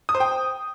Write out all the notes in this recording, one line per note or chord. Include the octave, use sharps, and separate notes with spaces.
D#6
C5
G5